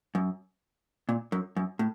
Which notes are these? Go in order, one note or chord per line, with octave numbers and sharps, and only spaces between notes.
F#2
A#2
F#2
F#2
A2